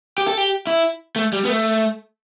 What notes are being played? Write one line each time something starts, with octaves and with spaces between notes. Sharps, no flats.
G4
A4
G4
E4
A3
G3
B3
A3